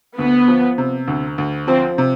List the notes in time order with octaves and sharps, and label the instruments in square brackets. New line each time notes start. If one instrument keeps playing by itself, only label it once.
[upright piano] D2 [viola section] B3
[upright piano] F3
C3
D2
D2
[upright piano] F3 [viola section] C4
[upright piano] C3